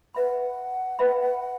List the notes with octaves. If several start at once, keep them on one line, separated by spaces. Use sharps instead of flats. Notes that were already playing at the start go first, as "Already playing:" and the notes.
B4 E5 F#5 B5
B4 E5 B5